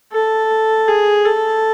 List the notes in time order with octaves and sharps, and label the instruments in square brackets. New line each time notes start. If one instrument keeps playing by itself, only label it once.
[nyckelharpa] A4
G#4
A4